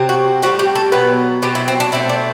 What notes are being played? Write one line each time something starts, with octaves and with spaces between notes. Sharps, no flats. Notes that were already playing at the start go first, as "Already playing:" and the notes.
Already playing: C3 F#3 C4
F#4
A2 G3 C4 F#4
G4
A4
B2 F#3 B3 B4
B2 F#3 C4 G4
E4
C4
D4
B2 A3 C4 E4
D4